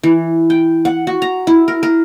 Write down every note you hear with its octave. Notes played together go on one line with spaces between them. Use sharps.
E3
G5
F#5
F#4
A#5
E4
A#4
A#4